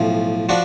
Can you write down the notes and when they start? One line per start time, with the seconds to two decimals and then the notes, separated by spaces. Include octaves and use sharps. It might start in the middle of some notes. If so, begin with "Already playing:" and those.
Already playing: B1 A2 F3
0.49 F3 D4 F#4